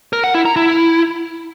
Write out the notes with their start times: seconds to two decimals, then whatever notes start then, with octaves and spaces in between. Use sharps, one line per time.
0.13 A#4
0.24 F#5
0.35 E4
0.45 A#5
0.56 E4